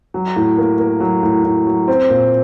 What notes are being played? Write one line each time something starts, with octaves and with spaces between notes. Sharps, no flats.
F#3
A2
A#3
A#3
F#3
A2
A2
F#3
C4
A#2